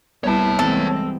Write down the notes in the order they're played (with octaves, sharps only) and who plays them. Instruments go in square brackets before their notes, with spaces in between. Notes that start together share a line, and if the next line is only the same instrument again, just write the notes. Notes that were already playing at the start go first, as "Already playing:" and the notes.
[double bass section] C2 G3 [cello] B3 E4 [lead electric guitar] C#5 A5
[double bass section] E3 G3 B3 [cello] G#3 C4 [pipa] A4